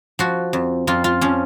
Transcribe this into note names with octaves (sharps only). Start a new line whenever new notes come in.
F3 F#4
F2
F2 F4
F4
F3 C#4